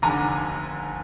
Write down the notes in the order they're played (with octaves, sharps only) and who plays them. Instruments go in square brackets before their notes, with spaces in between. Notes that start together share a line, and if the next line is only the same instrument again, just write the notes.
[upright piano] F1 D#2 D3 G#5 A#5